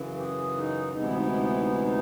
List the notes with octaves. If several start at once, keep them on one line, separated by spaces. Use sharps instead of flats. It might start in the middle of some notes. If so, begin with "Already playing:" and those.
Already playing: F#2 C#3 E3
G4
G#4
D#4
D2 C3 E3 G#3 B3 D#4
E4
D#4
E4
D#4
E4
D#4
E4
D#4